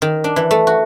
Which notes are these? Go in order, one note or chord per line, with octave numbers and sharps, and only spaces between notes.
D#3
D4
E3
A3
F#4